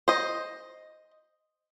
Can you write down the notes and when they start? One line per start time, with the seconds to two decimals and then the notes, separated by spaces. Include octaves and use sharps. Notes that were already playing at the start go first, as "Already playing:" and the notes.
0.08 C5 D#5